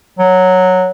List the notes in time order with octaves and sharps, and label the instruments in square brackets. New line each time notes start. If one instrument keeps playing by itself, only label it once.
[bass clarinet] F#3